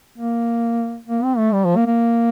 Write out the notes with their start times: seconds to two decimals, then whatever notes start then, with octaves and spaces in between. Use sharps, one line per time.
0.18 A#3
1.08 A#3
1.24 C4
1.38 A3
1.53 G3
1.65 F3
1.76 A#3
1.87 A#3